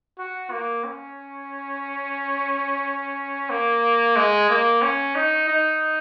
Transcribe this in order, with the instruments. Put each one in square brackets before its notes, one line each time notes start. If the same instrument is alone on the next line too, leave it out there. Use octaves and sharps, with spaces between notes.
[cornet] F#4
A#3
C#4
A#3
G#3
A#3
C#4
D#4
D#4